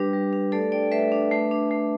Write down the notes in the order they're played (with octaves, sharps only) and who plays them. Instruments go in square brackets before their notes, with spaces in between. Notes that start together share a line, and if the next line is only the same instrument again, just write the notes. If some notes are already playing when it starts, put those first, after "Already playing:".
Already playing: [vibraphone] G3 D4 G4 B4
G3
D4
A3 A4 D5
D4 D5 G5
A3 B4 E5
D4
A3
D4
A3